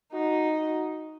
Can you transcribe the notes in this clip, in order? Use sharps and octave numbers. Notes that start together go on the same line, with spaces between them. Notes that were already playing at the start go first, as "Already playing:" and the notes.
D#4 F#4
F#4